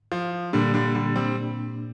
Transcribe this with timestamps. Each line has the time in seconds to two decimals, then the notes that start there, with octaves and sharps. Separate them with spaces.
0.12 F3
0.53 A#2 D3 G3 A#3 D4
0.74 D3 G3
0.95 D3 G3
1.16 G3 C4